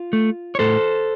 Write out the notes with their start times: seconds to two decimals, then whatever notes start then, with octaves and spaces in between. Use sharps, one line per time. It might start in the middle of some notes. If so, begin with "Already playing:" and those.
Already playing: F4
0.13 A3
0.55 C#5
0.59 A2 A4 C5